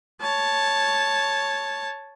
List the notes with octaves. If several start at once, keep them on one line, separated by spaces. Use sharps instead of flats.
C#5 A5